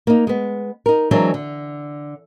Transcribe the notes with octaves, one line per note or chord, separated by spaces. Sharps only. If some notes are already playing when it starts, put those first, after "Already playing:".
A#3 D#4
G#3 B3
D#4 A#4
E3 F#3 G#3 C4 D4 A#4
D3